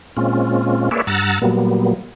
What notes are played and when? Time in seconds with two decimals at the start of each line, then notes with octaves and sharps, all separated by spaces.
0.17 A#2 G#3 C4 C#4 F4
0.91 A#3 G#4 B4 C#5 D5 E5
1.07 G2 F#5 A#5 E6 A6
1.42 A#2 F#3 G3 A#3 B3